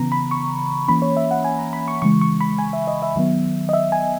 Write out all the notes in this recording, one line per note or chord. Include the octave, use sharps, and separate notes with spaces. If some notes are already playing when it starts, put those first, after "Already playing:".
Already playing: C#3 E3 B3 A#5
B5
C#6
E3 A#3 C#4 B5
C#5
E5
F#5
G#5
A#5
B5
C#6
C#3 E3 G#3 C#6
C#6
B5
G#5
E5
D#5
E5
D#3 F#3 B3
D#5
E5
G#5